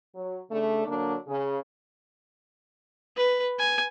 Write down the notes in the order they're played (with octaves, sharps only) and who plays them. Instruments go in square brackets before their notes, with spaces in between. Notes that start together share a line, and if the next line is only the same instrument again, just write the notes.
[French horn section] F#3
C#3 A3 D4
D3 F#3 A#3 D4
C#3
[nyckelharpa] B4
G#5